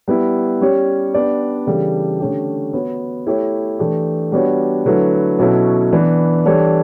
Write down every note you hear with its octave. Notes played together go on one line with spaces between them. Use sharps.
G3 B3 E4
G3 C#4 G4 C#5
B3 D4 G4 D5
C#3 E3 G3 D4 A4
D3 A3 C#4 G4
B3 F#4 C#5
A3 E4 G4 C#5
E3 A3 D4 G4
G3 B3 D4 F#4 C#5
D3 F#3 A3 E4 B4
B2 F#3 C#4 E4 A4
E3 B3 D4
E3 G3 D4 A4 C#5